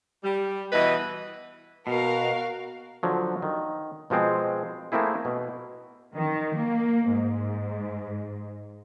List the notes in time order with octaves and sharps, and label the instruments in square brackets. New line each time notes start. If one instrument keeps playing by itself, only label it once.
[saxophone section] G3
B2 E3 B4 D#5
[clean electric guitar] B2 [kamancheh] A#3 F#4 [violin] A#4 F5
[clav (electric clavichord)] D3 F3 F#3
D#3
B2 F3 G#3 C4
A3 A#3 C4 E4 G#4
B2
[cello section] D#3
A#3
G#2